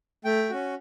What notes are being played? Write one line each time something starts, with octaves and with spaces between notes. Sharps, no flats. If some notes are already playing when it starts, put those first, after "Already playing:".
A3 G5
C#4 F#4